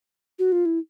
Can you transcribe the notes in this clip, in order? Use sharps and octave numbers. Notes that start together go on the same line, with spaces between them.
F#4
F4
E4